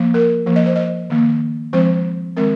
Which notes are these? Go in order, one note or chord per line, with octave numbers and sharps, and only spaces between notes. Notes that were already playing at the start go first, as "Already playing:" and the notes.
Already playing: F3 A#3
A#4
F3 A#3
D#5
C5
D#5
D#3 A#3
F3 G#3 C4 C5
D#3 G#3 C4 A#4